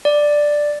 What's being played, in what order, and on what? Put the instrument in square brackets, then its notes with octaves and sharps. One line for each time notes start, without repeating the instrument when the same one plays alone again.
[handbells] D5